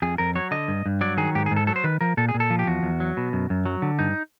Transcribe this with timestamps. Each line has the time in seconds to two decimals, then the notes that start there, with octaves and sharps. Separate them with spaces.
0.02 F2 G#4
0.18 F2 A#4
0.36 F#3 C#5
0.51 D3 D#5
0.68 G2
0.86 G2
1.01 F#3 D5
1.17 D#3 G#4
1.35 G#2 G4
1.46 G#4
1.51 G#2
1.56 A4
1.67 F#3 A4
1.76 C5
1.84 D#3 B4
2.01 F3 A#4
2.17 A#2 A4
2.29 G#4
2.34 A#2
2.40 A4
2.50 F3
2.59 G4
2.67 E2 F#4
2.83 E2
3.00 F#3
3.17 B2
3.33 F#2
3.50 F#2
3.65 F#3
3.82 D3
3.99 G2 D#4